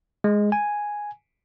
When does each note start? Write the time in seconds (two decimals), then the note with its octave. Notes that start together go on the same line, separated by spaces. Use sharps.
0.24 G#3
0.52 G#5